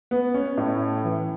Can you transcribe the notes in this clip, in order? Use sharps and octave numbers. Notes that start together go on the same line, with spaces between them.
B3
C#4
A2
E3